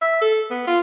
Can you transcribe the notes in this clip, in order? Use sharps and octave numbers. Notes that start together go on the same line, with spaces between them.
E5
A4
B3
F4